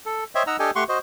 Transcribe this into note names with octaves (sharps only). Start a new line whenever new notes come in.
A4
C5 C#5 D#5 E5 G5
D#4 D#5 F#5 A#5 E6
D4 G4 A4 D#5 G5 G#5
A3 G4 F#5 C6 C#6
F#4 C5 D#5